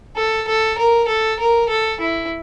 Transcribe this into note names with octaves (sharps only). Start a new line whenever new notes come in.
A4
A4
A#4
A4
A#4
A4
E4